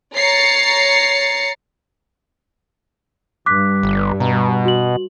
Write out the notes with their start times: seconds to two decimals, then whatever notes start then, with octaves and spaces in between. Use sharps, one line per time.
0.16 C#5 A#5 A6 C7 C#7
3.46 G2 D6 F#6 B6
3.83 G1
4.20 B2 A#5
4.65 F#4 F#7